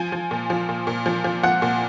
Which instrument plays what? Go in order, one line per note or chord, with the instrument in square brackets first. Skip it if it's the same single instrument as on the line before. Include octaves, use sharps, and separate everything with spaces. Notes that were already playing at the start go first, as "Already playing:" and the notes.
Already playing: [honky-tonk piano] F3 G#5
F3
A#2
F3
A#2
A#2
F3
F3
F3 F#5
A#2